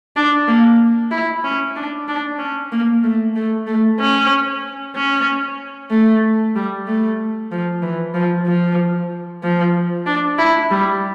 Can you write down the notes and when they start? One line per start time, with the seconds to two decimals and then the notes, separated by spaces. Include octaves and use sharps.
0.16 D4
0.48 A#3
1.11 E4
1.44 C#4
1.76 D4
2.08 D4
2.39 C#4
2.72 A#3
3.04 A3
3.36 A3
3.67 A3
4.00 C#4
4.96 C#4
5.91 A3
6.56 G3
6.87 A3
7.52 F3
7.82 E3
8.14 F3
8.46 F3
9.43 F3
10.06 D4
10.39 E4
10.71 G3